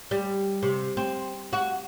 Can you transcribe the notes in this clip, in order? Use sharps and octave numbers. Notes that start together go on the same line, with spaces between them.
G3
C3
C4
F#4